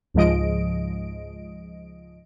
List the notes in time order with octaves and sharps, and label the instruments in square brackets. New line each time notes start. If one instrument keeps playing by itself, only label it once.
[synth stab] C#2 G#2 F3 G#3 D#5 D7